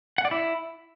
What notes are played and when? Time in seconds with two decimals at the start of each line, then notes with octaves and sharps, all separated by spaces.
0.18 F#5
0.25 D5
0.31 E4